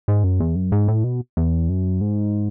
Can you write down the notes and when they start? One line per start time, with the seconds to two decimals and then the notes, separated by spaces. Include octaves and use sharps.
0.08 G#2
0.24 F#2
0.40 E2
0.55 F#2
0.72 G#2
0.88 A2
1.04 B2
1.37 E2
1.69 F#2
2.01 G#2